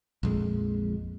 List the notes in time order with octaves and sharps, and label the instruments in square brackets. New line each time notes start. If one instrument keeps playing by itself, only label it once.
[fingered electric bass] A#1 F2 G#3